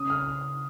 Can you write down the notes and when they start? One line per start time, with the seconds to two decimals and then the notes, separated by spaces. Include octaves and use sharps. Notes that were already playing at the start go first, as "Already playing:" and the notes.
Already playing: C#3 D#6
0.10 F6